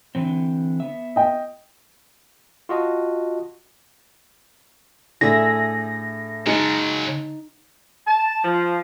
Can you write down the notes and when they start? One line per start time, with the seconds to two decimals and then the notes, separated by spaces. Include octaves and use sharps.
0.15 D3 E3 C4
0.80 B3 E5
1.16 D#5 G5
2.69 F4 F#4 D#5 A5
5.21 A2 D3 D4 G#4 E5 A#6
6.46 C#3 F#3 G#3 D#4 A5
8.07 A5
8.44 F3